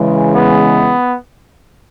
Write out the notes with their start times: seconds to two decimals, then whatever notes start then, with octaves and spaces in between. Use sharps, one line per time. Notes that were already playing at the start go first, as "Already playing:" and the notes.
Already playing: C#3 E3 G#3
0.35 B3